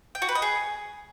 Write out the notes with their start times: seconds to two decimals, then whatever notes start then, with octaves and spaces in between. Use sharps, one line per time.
0.15 G5
0.22 F#4
0.29 B4
0.35 D#5
0.42 G#4